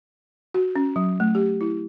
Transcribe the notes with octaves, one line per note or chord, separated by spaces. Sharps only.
F#4
C#4
F#3
A3
G4
E4